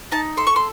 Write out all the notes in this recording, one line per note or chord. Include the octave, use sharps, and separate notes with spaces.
D#4 A5
A4 C6
C#6
C6